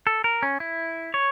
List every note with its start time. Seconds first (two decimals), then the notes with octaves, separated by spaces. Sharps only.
0.07 A4
0.24 A#4
0.43 C#4
0.60 E4
1.14 C#5